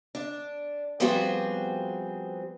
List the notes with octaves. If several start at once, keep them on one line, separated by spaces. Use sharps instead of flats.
D4
F3 G3 B3 C4 F#4 G#4